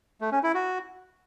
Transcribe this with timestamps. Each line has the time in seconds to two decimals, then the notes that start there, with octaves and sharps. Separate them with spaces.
0.21 A3
0.32 C#4
0.43 E4
0.54 F#4